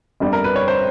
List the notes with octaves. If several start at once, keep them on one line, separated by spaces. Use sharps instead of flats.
G1 F2 D3 G3
A#4
B4
C#5
C5